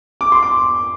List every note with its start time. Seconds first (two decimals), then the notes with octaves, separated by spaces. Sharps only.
0.21 D6
0.32 C6
0.43 D6